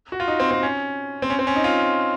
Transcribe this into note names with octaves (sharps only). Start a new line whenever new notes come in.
F#4
F4
D#4
C4
C4
C#4
C4
C#4
C4
C#4
D#4
F4